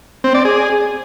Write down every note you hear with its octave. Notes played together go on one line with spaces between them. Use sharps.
C4
D5
G#4